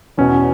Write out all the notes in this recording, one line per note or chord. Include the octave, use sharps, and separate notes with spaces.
E2 B2 C#4